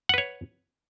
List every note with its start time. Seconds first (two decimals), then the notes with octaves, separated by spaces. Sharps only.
0.09 F#5
0.14 B4
0.18 C#5